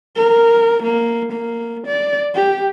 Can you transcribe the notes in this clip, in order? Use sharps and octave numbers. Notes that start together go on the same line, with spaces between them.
A#4
A#3
A#3
D5
G4